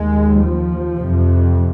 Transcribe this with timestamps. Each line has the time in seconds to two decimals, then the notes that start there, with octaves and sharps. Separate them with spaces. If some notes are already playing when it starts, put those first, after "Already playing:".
Already playing: D#2 G#3
0.42 F3
0.98 F2 C3